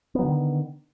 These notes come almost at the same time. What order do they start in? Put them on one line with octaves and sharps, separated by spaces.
B3 F#3 D3 D#3